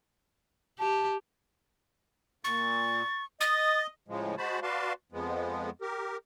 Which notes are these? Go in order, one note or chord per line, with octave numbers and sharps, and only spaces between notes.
G4 A5
A#2 C#6 A6
D#5 D#6 A6
A2 C#3 F3 G#3
G#3 F#4 C5 A5 B5
F#4 B4 D5 F5 A5 C6
F2 F3 G#3 B3
G4 A#4